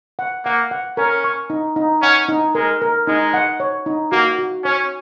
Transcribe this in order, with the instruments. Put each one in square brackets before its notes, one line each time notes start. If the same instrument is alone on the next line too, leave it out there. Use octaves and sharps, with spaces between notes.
[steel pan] F#5
[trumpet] A#3 [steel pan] F#5
[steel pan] F#5
[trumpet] C#4 [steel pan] A#4
[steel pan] C#6
D#4
D#4
[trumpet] C#4 [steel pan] F#5
[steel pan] D#4
[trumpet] G#3 [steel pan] A#4
[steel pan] A#4
[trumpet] G#3 [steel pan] D#4
[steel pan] F#5
C#5
D#4
[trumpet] A#3 [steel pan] F#4
[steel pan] F#4
[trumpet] C#4 [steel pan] C#5